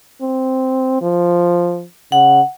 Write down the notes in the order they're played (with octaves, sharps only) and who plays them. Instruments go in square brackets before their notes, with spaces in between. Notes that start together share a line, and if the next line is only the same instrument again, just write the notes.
[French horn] C4
F3
[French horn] C#3 [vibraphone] F#5